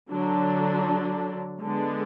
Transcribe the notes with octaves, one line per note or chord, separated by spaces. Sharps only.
D3 F#3 D4
D3 G#3 B3 D4